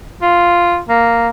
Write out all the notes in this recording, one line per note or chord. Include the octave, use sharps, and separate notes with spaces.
F4
A#3